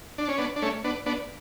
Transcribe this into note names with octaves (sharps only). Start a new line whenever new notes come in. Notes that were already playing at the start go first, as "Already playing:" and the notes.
D4
C#4
B3 D4
D4
A3 C#4
B3 D4
B3 D4